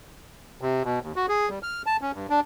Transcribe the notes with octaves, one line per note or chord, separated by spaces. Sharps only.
C3
B2
D#2
F#4
G#4
G3
F6
A5
C#4
G2
D4